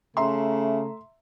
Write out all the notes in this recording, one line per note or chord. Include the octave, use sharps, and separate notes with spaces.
C#3 A3 E5 A#5 C6